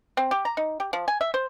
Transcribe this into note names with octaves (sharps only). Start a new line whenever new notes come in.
C4
G4
A#5
D#4
G4
F3
G#5
E5
C5